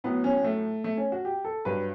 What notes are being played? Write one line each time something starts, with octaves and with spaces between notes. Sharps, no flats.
A2 F#3 B3
C#4
A3
A3
C#4
F#4
G4
A4
G2 F#3 B4